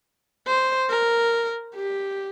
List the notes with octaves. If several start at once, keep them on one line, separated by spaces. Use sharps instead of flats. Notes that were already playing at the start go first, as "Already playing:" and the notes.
C5
A#4
G4